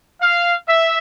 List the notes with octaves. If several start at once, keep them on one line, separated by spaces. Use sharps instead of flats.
F5
E5